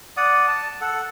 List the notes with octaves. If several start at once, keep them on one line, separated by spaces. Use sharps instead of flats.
D5 F#5 D#6
A5
A4 F#5